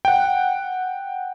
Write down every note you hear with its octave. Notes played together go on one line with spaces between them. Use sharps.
F#5 G5